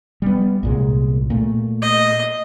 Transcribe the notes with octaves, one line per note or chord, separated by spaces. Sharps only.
G3 B3
C2 A#2 G#3
A#2 A3
D#5